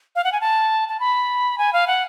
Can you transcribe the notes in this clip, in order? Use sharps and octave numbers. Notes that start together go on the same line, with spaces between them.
F5
F#5
G#5
A5
A5
B5
G#5
F5
F#5